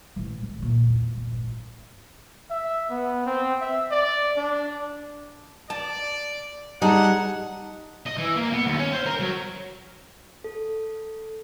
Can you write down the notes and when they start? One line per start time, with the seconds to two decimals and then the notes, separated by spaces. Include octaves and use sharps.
0.16 A1 E3
0.43 D2
0.59 A#2 A3
0.86 E2 D3
1.17 A#2
1.32 G#1
2.50 E5
2.90 B3
3.26 C4
3.61 E5
3.91 D5
4.37 D4
5.70 D5 A5
6.82 G3 D#4 G#4 F#5 A5
8.06 D#5
8.18 E3
8.36 A#3
8.53 B3
8.66 D#2
8.78 C#4
8.92 C5
9.06 A#4
9.20 F#3
10.44 A4